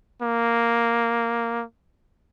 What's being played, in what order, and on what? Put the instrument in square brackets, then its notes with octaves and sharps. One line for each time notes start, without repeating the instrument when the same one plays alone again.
[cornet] A#3